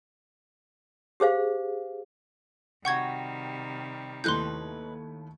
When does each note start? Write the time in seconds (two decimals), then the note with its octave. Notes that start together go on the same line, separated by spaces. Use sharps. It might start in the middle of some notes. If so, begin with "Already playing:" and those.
1.20 G4 G#4 C5 F5
2.85 C3 D#3 G3 F#4 F#5 G5 C#6 G#6
4.24 D#2 A3 D#4 E4 B4 C6 F#6 G6